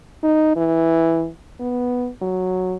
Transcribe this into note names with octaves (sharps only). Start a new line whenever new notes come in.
D#4
E3
B3
F#3